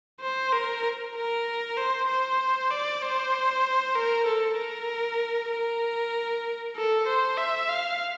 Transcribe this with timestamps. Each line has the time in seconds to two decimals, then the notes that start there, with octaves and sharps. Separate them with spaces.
0.21 C5
0.52 A#4
1.15 A#4
1.77 C5
2.08 C5
2.71 D5
3.02 C5
3.96 A#4
4.26 A4
4.57 A#4
5.51 A#4
6.76 A4
7.07 C5
7.38 E5
7.69 F5